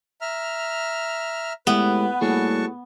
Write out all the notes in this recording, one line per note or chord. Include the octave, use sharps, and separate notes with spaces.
E5 A#5 F6
A2 G#3 B3 G4 B4 E5
A2 G3 A#3 F#4 G#4 A5 C#6